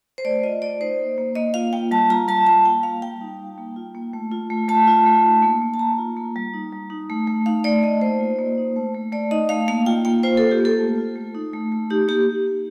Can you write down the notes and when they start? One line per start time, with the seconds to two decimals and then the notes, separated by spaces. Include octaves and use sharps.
0.18 C5
0.25 A3 D5
0.44 F4 D#5
0.62 A3 D5
0.80 D#4 C5
0.99 A#3
1.18 A#3
1.35 A#3 D#5
1.54 F4 F5
1.73 A#3 G5
1.91 G3 A5
2.10 F4 A#5
2.28 G3 A5
2.47 F4 A5
2.65 A#3 G5
2.83 A#3 F5
3.02 G3 G5
3.21 D#4
3.39 G3
3.58 A#3
3.76 F4
3.95 A#3
4.14 A3
4.32 F4
4.50 A3
4.68 A3 A5
4.87 F4
5.06 A3
5.25 D#4
5.42 A#3
5.62 A#3
5.74 A5
5.79 A#3 A#5
5.98 F4
6.17 A#3
6.36 G3
6.54 D#4
6.72 G3
6.90 D#4
7.10 A3
7.27 A3
7.46 D#4 F5
7.64 A3 D5
7.83 A3 D#5
8.01 A#3 C5
8.20 F4
8.38 A#3
8.58 D#4
8.76 A3
8.94 A3
9.12 A3 D5
9.31 D#4 D#5
9.49 A3 F5
9.68 A#3 F5
9.86 F4 G5
10.05 A#3 G5
10.23 F4 C5
10.37 A#3 A4
10.51 G4
10.60 A#3 A4
10.79 A3
10.98 F4
11.15 A3
11.35 D#4
11.53 A3
11.72 A3
11.90 D#4 G4
12.08 A#3 G4